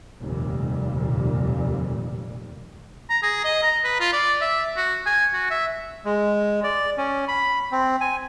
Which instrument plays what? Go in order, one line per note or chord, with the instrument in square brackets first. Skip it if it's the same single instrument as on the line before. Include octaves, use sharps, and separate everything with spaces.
[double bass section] F1 D#2 A#2 G3
[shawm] A#5
G#4
D#5
A#5
B4
F4
D5
E5
F#4
G#5
F#4
E5
[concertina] G#3
D5
C#4
B5
C4
G#5